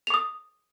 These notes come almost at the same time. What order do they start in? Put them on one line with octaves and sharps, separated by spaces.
F7 D6 D#6